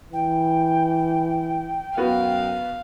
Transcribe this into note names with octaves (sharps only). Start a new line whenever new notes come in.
E3 G5
F#2 B3 F#4 B4 F5